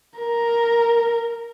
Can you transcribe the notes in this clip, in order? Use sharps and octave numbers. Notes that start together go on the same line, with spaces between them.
A#4